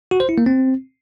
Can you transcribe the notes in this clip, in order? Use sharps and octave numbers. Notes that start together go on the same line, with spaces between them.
F#4
C5
E4
A#3
C4